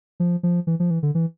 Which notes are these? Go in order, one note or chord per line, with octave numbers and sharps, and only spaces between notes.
F3
F3
E3
F3
E3
D3
E3